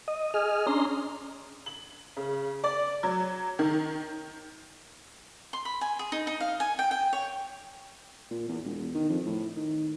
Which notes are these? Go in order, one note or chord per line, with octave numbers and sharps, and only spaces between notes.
D#5
G#4 D#5 F6
C#4 D4 A#5 C6
F#7
C#3
D5
F#3
D#3
C6
B5
G#5
G#4
D#4
D#4
F5
G#5
G5
G5
C#5
A#2
E2
E1
D#3
F2
A2
D#3